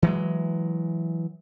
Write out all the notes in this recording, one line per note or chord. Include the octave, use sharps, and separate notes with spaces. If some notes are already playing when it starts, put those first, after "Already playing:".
E3 F#3 G#3